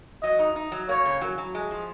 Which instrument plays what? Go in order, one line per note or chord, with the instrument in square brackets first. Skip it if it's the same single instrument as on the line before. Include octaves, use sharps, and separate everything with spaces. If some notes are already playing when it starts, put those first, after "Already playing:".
[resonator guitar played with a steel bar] F#3 [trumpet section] D#5
[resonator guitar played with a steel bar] D#4
D#4
F#3
[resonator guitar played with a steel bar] A#3 [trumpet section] C#5
[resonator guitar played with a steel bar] C#3
F#3
F#3
G#3
F3